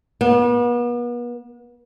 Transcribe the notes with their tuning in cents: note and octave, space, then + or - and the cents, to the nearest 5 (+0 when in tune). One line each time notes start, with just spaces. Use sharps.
B3 -40